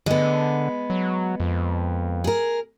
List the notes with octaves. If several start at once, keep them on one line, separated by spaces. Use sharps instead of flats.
D3 G#3 B3
F#3
F2
G#4 A#4